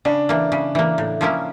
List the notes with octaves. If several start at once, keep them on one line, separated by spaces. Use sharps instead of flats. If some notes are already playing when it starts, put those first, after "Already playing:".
C#3 D4
E3 A#3
C#3
E3 A#3
A2
F3 A#3 C#4 E4